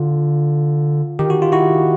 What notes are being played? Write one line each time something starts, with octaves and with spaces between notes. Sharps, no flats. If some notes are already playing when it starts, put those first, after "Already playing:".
Already playing: D3 F4
D#3 G4
F#4
F4
E4 F#4